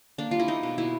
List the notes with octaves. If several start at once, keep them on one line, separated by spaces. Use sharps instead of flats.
A#3 D4
G3 F4
E4
A#3 D#4
B2
B2 E4